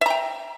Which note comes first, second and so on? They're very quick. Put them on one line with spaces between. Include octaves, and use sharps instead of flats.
E5 A#5 G5